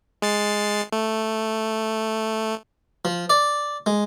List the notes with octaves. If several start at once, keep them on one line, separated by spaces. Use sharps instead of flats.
G#3 A6 C7
A3
F3
D5
G#3